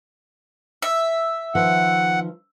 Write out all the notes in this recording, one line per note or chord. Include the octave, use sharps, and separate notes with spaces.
E5
D#3 F3 B4 F#5